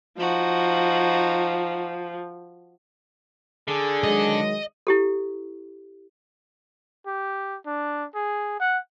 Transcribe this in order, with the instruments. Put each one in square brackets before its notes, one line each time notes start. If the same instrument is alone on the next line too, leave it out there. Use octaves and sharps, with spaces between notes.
[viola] F3 [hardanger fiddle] D#4 F#4
[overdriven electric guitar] D3 [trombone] G#4
[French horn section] D#3 F#3 G#3 [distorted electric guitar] D#5
[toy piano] E4 G4 A4
[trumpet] G4
D4
G#4
F#5